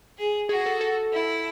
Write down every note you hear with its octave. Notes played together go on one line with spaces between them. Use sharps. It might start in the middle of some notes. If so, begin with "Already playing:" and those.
G#4
F#4 G#4
G#4
A4
A4
E4